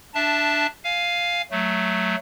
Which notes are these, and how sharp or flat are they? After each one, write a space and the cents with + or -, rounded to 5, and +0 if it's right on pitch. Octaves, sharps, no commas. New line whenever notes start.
D4 +5 E5 +0 A5 -5
F5 +0 G#5 +5
F#3 +0 A3 +0